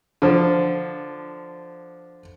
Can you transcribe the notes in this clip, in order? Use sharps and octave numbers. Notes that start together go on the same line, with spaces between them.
D3 F3